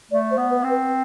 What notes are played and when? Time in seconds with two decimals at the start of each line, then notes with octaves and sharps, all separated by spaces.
0.11 A3 D5
0.31 C5
0.38 B3
0.51 B4
0.64 C4
0.70 B4